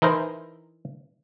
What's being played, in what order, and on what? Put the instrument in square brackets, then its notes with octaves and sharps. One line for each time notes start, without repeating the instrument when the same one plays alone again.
[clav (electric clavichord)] E3 D#4 E4 A#4 C5